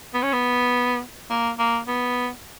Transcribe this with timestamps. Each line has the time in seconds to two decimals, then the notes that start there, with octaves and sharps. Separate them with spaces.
0.14 B3
0.23 C#4
0.33 B3
1.30 A#3
1.59 A#3
1.88 B3